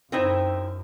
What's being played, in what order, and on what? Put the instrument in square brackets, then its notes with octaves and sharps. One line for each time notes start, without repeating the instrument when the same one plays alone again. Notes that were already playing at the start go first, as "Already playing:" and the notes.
[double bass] F#2 [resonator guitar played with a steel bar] C4 D#4 E4 [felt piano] C5 G5